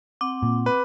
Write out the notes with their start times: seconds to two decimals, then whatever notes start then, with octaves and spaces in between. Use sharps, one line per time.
0.21 C4 F#5 D6
0.43 A#2
0.66 B4